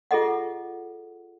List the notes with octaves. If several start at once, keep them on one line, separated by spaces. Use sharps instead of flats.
F4 G#4 A4 D#5 F#5